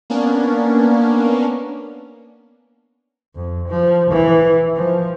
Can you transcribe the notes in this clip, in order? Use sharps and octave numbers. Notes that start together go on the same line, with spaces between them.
A#3 B3 C#4 D4
F2
F3
E3
F3